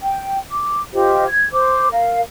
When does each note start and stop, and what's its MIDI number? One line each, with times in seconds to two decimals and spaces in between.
0.02 0.38 79
0.49 0.80 86
0.94 1.26 65
0.94 1.26 67
0.94 1.26 72
0.94 1.26 75
1.27 1.48 92
1.52 1.87 72
1.52 1.87 86
1.92 2.20 70
1.92 2.20 77